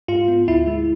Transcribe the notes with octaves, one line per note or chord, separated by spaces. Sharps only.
G#2 F4
B3
D2 E4
G#3